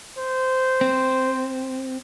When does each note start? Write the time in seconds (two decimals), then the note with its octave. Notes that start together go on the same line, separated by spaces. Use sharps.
0.18 C5
0.81 C4